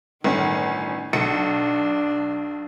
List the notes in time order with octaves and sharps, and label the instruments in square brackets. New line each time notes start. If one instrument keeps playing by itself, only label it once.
[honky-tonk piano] G1 C#4 [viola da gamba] A2 D#3
[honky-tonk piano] B1 C#7 [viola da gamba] D4